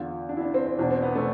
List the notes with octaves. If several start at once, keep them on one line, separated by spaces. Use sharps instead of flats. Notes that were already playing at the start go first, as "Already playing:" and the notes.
Already playing: E2 D3 F4
D4
E4
D4
C4
C4
E2 B2 D4
C4
B3
A3